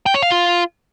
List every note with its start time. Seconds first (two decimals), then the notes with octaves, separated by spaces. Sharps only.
0.06 G5
0.14 C#5
0.22 F5
0.31 F4